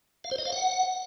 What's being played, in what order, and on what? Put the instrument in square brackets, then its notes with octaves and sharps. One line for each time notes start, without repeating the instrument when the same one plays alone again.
[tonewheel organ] F5
C5
D#5
F5
F#5